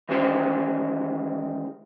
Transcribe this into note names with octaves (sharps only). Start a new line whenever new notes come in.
D#3 E3 G#3 C#4 G4 C5